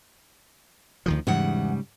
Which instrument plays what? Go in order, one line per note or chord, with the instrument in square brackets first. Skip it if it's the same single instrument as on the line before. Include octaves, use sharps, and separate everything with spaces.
[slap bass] D2 D#3 F3
[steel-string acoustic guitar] E2 F#5 [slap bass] G#2 C#3 G3